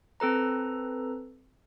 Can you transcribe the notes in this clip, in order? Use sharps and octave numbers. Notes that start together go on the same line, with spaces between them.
C4 A4 B4 A#5